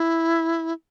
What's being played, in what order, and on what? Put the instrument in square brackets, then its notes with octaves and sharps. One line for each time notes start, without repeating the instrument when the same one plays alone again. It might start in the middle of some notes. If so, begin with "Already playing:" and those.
Already playing: [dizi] E4